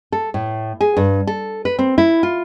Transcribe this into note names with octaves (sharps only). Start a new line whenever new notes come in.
A4
A2
G#4
G2
A4
B4
C4
E4
F4